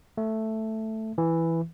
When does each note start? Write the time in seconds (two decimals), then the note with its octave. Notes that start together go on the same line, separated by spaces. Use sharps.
0.17 A3
1.18 E3